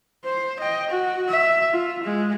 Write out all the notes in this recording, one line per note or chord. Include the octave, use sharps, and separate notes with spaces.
C5
D#5 G5
F#4
E5
F4
G#3